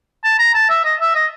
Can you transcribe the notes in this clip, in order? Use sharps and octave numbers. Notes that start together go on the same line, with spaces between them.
A5
A#5
A5
E5
D#5
E5
D#5